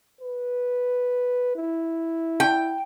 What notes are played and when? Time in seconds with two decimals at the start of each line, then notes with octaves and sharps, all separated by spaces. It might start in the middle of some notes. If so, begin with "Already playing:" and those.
0.21 B4
1.56 E4
2.40 G5